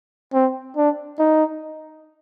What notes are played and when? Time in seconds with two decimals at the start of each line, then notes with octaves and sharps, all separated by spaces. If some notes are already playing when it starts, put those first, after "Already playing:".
0.34 C4
0.77 D4
1.19 D#4